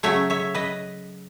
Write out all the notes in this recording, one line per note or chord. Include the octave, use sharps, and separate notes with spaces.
C#3 F#3 A3 C#5 E5
C#5 E5
B4 D#5